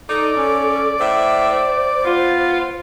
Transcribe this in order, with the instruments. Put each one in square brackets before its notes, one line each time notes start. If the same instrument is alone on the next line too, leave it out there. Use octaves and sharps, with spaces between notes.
[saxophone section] D#4 [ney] A4 [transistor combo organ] D5
[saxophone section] C#4
[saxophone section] A2 E5 [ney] C5
[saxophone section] B3 F4